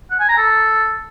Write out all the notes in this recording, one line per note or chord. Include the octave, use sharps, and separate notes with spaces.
F#5
G#5
A#5
A4